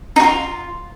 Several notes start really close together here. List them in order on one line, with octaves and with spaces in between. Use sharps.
D#4 F#4 F4